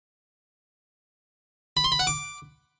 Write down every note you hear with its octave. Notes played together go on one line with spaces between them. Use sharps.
B5
C6
B5
F#5
D6